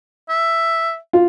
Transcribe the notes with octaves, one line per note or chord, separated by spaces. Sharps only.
E5
F4